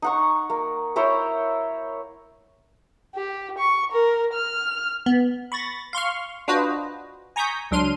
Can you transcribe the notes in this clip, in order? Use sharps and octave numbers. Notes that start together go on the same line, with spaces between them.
D#4 F#5 C#6
A#3
E4 A#4 C5 C#5
G4
C#6
A#4
F6
B3
B5 C#6 A6 A#6
F5 C6 C#6 F6
D4 F4 F#4 B4 C5 D#5
G#5 A#5 C#6 D#6 G6 B6
C#2 F#3 D4 C6 F6 D#7